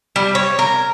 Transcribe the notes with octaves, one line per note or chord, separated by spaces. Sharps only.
G3
C#5
A#4